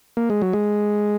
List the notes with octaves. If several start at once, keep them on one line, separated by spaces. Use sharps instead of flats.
A#3
G#3
F#3
G#3